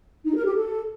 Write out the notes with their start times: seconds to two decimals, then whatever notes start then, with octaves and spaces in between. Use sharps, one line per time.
0.25 D#4
0.35 A#4
0.45 G4
0.55 A4